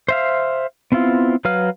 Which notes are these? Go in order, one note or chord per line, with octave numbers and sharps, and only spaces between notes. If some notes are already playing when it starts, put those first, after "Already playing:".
C5 E5 F5
B3 C4 E4 F4
F#3 B4 F5 F6